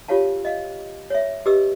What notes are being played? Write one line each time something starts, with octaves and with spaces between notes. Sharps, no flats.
F4 G4 C#5 F5 A5
D#5 F5
C#5 E5
G4 B4 D#5 D6 E6